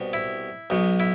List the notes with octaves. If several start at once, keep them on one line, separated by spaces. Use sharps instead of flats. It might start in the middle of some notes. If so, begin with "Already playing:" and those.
Already playing: C2 B2
E4
B1 B2
E4